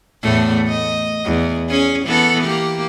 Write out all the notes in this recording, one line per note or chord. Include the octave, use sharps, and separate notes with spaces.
E2 A2 A3
D#5
E2
C#4 G#4
E3 B3 A4
A#3 G4